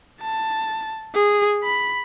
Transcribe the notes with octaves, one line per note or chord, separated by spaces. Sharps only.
A5
G#4
B5